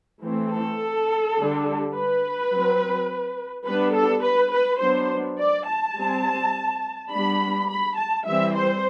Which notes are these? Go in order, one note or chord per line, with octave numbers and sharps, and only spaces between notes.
E3 A3 C4
A4
D3 G3 D4
B4
F#3 C4
G3 B3 D4 B4
A4
B4
B4
F#3 B3 D4 C5
D5
A5
G3 C4
G3 B3 D4 B5
B5
A5
E3 G3 C4 E5
C5